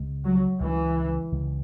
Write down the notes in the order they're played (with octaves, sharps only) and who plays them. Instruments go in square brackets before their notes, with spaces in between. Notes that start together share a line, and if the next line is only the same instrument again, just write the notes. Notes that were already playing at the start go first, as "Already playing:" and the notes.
Already playing: [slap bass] C#2 C#3 G#3
[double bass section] F#3
[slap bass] C#2 C#3 G#3 [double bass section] E3
[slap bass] C#2 C#3 G#3